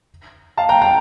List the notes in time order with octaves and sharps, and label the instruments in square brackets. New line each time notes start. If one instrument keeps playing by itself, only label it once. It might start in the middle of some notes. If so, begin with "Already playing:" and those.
[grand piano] F5 A5
G5 A#5
G5 A#5